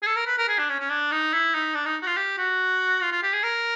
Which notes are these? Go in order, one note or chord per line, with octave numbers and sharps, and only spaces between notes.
G#4
A4
A#4
B4
A#4
G#4
D4
C#4
C#4
D4
D#4
E4
D#4
D4
D#4
F#4
F4
G4
F#4
F4
F4
G4
G#4
A#4